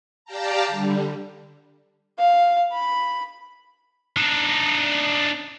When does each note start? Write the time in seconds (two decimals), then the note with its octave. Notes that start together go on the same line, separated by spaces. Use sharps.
0.25 G4 D5 F5 G5 A5 A#5
0.68 D3 G3
2.19 F5
2.73 B5
4.17 D4 D#4